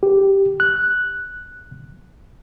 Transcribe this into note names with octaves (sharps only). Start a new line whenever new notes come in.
G4
F#6